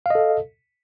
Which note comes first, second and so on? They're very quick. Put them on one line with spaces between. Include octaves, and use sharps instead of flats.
F5 D#5 A4